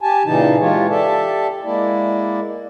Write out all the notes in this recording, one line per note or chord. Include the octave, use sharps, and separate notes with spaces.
G4 G#5 A5
A#2 C#3 E3 D#4 A5
E3 G#3 F4 G4 C#5
G4 A4 D5 E5 A5
G#3 A#3 E4 D5